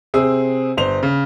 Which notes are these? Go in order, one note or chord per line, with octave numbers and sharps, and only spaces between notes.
C3 C4 G#4 E6
G1 C5 F7
C#3